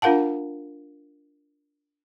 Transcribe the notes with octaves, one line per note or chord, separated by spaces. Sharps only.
D4 F4 A#4 F5 F#5 A5